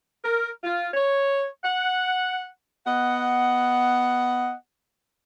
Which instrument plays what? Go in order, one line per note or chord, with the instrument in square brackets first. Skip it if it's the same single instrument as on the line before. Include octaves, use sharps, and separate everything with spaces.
[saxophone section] A#4
F4
C#5
F#5
B3 D#5 F#5